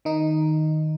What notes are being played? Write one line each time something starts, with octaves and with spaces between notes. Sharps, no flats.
D#3 D#4